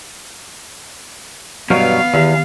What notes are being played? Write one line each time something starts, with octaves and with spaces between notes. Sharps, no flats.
G2 B2 F#3 B3 F5 F6
E2 D#3 G4